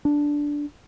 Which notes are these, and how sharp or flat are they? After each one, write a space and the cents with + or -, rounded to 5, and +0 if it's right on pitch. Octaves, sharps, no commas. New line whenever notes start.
D4 -5